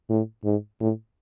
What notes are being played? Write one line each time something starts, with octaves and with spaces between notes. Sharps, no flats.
A2
G#2
A2